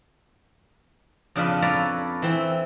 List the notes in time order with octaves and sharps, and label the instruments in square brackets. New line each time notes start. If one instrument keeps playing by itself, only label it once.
[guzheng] F2 C#3 D4 F4 B4
A4 B4 C#5 D5 A#5
E3 C4